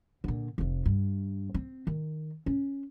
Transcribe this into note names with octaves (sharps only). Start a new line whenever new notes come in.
A#2 D3
F1 F2
G2
C4
D#3
C#4